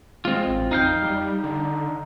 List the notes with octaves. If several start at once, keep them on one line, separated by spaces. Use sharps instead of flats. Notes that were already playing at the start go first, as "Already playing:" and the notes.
G#3 C4 F4
A1
F2 D#4 F5 G5
G3
D3